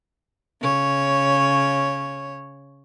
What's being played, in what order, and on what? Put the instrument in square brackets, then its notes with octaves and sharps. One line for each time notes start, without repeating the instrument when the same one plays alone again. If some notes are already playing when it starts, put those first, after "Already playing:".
[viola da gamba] C#3 C#5